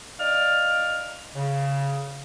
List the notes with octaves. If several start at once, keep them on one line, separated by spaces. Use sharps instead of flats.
D#4 D5 F5 F6
C#3